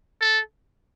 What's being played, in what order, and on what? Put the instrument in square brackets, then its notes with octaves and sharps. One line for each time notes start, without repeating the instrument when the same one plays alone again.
[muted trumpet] A4